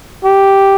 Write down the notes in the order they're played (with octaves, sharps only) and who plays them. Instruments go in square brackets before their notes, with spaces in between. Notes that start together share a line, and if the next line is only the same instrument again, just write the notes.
[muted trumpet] G4